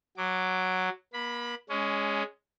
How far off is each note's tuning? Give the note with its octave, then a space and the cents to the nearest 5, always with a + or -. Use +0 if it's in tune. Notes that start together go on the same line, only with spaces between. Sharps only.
F#3 +0 D6 +0
A#3 +40 B5 +0
G#3 +0 C#4 +15